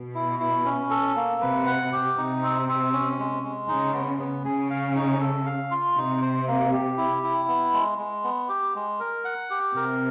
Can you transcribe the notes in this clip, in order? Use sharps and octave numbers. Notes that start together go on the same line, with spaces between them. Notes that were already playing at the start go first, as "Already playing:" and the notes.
Already playing: B2
E4
E4
C#4
A4
A#3
C3 B4
F#5
G4
C3 D#4
C4
C4
C#4
G#3
G#3
C#3 D#4
B3
B3
C#3 G#4
F5
D#4
A4
F5
F4
C3 D#4
C5
A#3
G4
E4
E4
B3
G#3
G#3
B3
G4
G#3
A#4
F#5
G4
C3 A#4